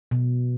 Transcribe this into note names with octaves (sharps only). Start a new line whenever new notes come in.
B2